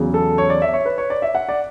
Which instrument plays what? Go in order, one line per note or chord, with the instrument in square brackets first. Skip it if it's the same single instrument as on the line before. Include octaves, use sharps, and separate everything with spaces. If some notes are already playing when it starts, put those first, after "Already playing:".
Already playing: [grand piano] E2 C#3 F#3
A4
C#5
D5
E5
C#5
B4
C#5
D5
E5
F#5
D5